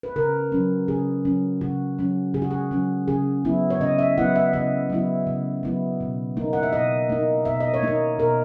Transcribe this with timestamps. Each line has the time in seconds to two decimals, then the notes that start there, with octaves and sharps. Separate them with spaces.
0.03 B4
0.16 C#3 A#4
0.52 F#3 C#4
0.88 C#3 G#4
1.25 F#3 C#4
1.61 C#3 F#4
1.99 F#3 C#4
2.34 C#3 G#4
2.42 F#4
2.51 G#4
2.71 F#3 C#4
3.08 C#3 G#4
3.45 F#3 B3 E4
3.70 C#5
3.80 C#3 D#5
3.99 E5
4.18 F#3 B3 E4 F#5
4.36 E5
4.53 C#3 D#5
4.90 F#3 B3 E4
5.27 C#3
5.63 F#3 B3 E4
6.01 B2
6.37 A#3 D#4
6.53 F#5
6.63 E5
6.73 B2 D#5
7.10 A#3 D#4
7.45 B2 E5
7.60 D#5
7.74 C#5
7.83 A#3 D#4 D#5
8.19 B2 A#4